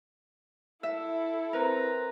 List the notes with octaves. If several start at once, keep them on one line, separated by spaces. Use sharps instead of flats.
E4 A4 E5
C4 A#4 B4 A#5